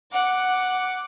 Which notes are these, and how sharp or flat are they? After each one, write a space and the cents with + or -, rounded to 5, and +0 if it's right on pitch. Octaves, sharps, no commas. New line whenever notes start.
F#5 +0 D6 +0